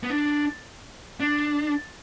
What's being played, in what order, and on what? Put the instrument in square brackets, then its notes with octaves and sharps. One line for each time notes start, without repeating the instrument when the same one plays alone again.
[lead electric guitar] B3
D4
D4